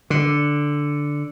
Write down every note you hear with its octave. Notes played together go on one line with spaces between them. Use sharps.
D3